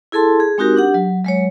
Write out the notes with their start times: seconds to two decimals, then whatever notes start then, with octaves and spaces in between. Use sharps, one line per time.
0.12 E4 G#4 A4 A5 C6
0.40 G#4
0.58 G#3 C4 D#4 F#4 G4 A#4
0.76 D4 G4 F#5
0.94 F#3
1.24 F#3 G#3 C#5